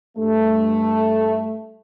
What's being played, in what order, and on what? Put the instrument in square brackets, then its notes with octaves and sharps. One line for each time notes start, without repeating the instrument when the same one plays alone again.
[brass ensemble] G2 A3